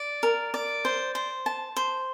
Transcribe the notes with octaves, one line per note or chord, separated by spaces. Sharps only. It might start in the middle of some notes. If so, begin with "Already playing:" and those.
Already playing: D5
A#4
D5
C5
C5
A5
C5